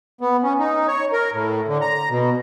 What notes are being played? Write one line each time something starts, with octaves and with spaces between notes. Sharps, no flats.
B3
C#4
D#4
C#5
A#4
A2
D3
A#5
B2